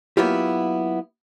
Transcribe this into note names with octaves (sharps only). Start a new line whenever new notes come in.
F#3 A#3 B3 E4 F4 G4